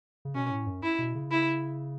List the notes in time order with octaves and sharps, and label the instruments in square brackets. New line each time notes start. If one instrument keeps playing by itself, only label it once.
[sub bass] C#3
[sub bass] B2 [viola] C#4
[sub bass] A2
F#2
[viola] E4
[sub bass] B2
C#3
[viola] E4